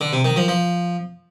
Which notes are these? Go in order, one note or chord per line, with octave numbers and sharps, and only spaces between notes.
D3
C3
D#3
F3
F3